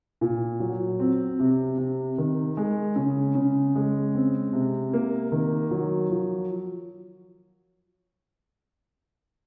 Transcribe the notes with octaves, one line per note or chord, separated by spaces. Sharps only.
A#2
F#3
C4
C3
C3
D#3
G#3
C#3
C#3
G#3
C4
C3
A#3
D#3
F#3
F3